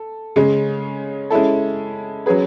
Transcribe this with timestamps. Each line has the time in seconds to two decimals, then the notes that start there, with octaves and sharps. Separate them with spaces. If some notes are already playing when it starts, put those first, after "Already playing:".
Already playing: A4
0.36 C#3 G#3 C#4
1.31 G#3 C#4 E4 A4
2.26 F#3 C#4 G#4 B4